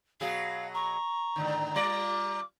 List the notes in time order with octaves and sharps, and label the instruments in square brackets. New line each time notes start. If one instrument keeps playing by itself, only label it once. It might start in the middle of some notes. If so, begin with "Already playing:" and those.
[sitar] B2 F#3 G#4 [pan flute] F5
[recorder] A#5 [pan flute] C#6
[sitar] G#2 D3 D#3
[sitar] G3 F4 D5 [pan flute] D6